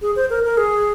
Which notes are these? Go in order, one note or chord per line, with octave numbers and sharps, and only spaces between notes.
G#4
C5
A#4
A#4
G#4